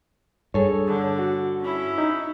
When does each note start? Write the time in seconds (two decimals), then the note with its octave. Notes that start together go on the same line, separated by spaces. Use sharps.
0.54 G2 G#4 A4 C#5
0.88 D3
1.19 F#4
1.61 C#4 E4
1.98 D#4